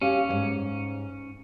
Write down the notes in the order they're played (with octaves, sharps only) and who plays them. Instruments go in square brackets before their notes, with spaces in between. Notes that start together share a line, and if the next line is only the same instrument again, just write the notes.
[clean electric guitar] C#4 [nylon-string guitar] G4 F5 G#5
[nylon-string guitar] E2 G#2